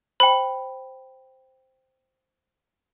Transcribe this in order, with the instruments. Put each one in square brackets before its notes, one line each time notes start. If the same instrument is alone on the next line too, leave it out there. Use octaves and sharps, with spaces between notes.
[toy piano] C5 G5 [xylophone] B5